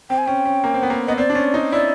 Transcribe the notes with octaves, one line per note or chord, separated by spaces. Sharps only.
C4 G5
G#5
C#4 G5
C#4
A#3
C4
B3
A#3
B3 D#5
C4 D5
D4
C#4
D#4
E4 D5